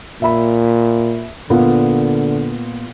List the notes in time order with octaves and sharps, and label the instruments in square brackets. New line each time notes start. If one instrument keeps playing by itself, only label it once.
[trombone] A#2 [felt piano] E5 B5
[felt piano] A#2 B3 F4 [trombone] D3